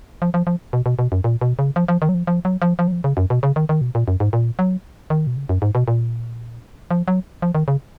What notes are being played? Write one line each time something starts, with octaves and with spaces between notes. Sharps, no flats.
F3
F3
F3
B2
B2
B2
F#2
A#2
B2
C#3
F3
F3
D#3
F#3
F3
F3
F#3
F3
F3
F#3
F3
C#3
F#2
B2
C#3
D#3
D#3
B2
A#2
F#2
G#2
A#2
F#3
D#3
B2
C#3
F#2
G#2
B2
A#2
F3
F#3
F3
D#3
C#3